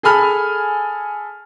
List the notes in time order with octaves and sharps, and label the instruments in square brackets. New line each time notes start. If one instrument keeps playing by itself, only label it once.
[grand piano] G#4 A4 G#5 B5 F6